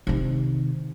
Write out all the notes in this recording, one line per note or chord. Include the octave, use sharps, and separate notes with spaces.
C3 D#3